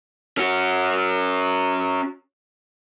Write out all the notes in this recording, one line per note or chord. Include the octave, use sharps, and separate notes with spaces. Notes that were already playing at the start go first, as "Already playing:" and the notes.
C#4 F#4